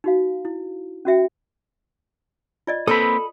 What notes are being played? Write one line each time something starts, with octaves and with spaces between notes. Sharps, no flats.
D#4 F#4 F5
E4
C#4 F#4 E5 G5
F4 D5 D#5
A#3 C4 A4 B4 B5 D#6